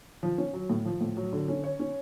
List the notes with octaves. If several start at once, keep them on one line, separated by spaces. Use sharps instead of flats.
F3
C#4
F#3
A2
F3
A2
F#3
D3
C#4
C#5
C#4